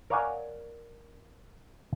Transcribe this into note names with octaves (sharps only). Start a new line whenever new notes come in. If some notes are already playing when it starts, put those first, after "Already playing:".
A#4 C#5 D5 F5 F#5 G#5